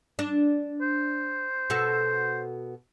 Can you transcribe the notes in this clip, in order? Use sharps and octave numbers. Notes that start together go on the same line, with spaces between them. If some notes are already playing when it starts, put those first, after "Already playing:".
D4
C5
B2 F#4 A4